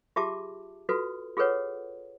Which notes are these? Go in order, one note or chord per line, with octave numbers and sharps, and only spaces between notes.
F4 G4 G#4 E5 A5 D6
F4 F#4 A4 B4
F4 G#4 A4 B4 C#5 F#5